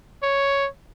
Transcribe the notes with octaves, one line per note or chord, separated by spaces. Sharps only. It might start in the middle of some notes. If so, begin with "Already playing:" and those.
C#5